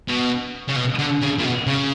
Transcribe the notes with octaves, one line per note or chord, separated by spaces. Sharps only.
B2
C#3
B2
D3
C#3
A#2
B2
C#3